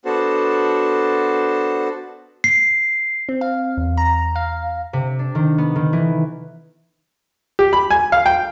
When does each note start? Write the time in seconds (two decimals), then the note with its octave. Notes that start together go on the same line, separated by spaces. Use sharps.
0.05 B3 D4 F#4 A4 C5 A5
2.44 C7
3.29 C4
3.41 F5
3.77 E2
3.97 A#5
4.36 F5
4.93 C3
5.19 D4
5.35 D#3
5.58 B3
5.76 D#3
5.93 E3
7.59 G4
7.73 B5
7.90 G#5
8.12 F5
8.26 G5